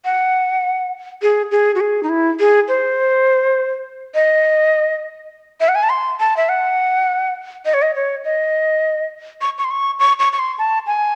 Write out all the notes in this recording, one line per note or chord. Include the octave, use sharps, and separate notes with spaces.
F#5
G#4
G#4
F#4
G#4
D#4
E4
G#4
C5
D#5
E5
F#5
G#5
A5
C6
A5
E5
F#5
D#5
C#5
D#5
C#5
D#5
C#6
C#6
C6
C#6
C#6
C#6
C#6
C6
A5
G#5